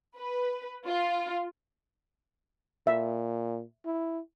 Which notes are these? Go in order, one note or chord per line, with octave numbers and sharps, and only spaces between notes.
B4
F4
A#2 E5
E4